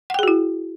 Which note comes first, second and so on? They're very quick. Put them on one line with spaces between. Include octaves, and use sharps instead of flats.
F#5 G5 G#4 F#4 E4